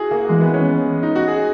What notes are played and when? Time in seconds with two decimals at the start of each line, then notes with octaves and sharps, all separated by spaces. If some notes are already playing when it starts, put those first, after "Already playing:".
Already playing: E4 F#4 G#4
0.11 A#3
0.29 E3 G#3
0.41 B3
0.54 C#4
1.03 D#4
1.15 F#4
1.28 G#4